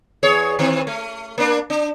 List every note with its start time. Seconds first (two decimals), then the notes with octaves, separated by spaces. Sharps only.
0.23 E2 G#4 C#5
0.59 D#3 C4
0.87 A3
1.38 A#3 D4
1.70 D4